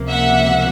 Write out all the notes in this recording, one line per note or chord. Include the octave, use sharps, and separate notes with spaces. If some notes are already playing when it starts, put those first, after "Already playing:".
Already playing: C#2 C3 F3 A#3
E5 F#5